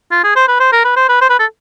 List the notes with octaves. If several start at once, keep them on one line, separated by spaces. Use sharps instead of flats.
F4
G#4
C5
B4
C5
A#4
B4
C5
B4
C5
B4
A4